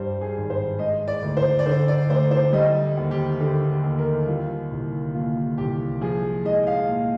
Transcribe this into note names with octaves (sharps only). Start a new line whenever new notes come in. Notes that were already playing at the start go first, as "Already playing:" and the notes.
Already playing: G2 G3 C5
G#4
G#1
C5
G#3 D#5
D5
D2
C5
D5
D3 C5
D5
D2 C5
C5
G3 D#5
D#2
G4
D3 G4
G4
D#2
A#4
G3 F4
C2
A#2 F4
C2 G4
F3 G#4
G#3 D#5
F5
A#2